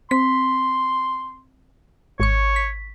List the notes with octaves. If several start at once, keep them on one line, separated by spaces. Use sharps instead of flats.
C4 C6 B6
G#1 C#5 C#6
B6